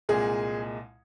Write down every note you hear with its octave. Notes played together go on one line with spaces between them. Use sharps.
C2 A#2 G#3 G#4